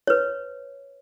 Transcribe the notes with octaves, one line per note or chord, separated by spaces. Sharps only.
B4 C#5